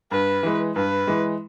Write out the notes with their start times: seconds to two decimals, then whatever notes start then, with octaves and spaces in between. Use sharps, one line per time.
0.12 G2 B4
0.43 E3 G#3
0.76 G2 B4
1.07 E3 G#3